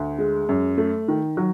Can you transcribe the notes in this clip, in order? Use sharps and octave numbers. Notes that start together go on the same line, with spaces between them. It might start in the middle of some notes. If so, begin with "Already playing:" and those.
Already playing: D2
G#3
F#2
A3
D#3
F#3